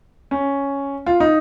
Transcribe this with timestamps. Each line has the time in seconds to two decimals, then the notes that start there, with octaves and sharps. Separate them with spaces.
0.31 C#4
1.07 F4
1.20 D#4